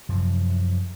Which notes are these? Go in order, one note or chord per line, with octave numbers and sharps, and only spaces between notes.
F#2 C3 F3